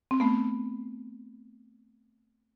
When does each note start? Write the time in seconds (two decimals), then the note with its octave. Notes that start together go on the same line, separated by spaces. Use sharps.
0.11 C4
0.20 A3 B3